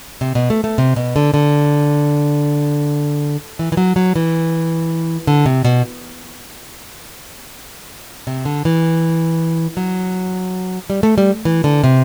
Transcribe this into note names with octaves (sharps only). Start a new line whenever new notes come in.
C3
B2
A3
A3
C3
B2
D3
D3
E3
E3
F#3
F#3
E3
D3
C3
B2
C3
D3
E3
F#3
G3
A3
G3
E3
D3
C3